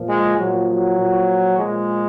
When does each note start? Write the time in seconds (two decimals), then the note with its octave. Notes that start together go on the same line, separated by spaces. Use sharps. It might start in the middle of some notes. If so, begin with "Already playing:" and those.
Already playing: A#2 F3
0.09 G#3
0.39 A#2 F3 F#3
0.69 F#3
0.99 A#2 F3
1.58 A#2 F3 G#3